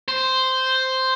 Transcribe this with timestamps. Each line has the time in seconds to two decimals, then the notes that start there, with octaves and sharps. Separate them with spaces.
0.08 C5